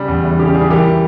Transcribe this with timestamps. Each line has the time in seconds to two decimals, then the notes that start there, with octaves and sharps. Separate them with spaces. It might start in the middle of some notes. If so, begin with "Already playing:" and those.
Already playing: C#3 G3
0.08 E2
0.24 E3
0.39 C#3 G4
0.54 G3 G#4
0.70 E3 G4 A#4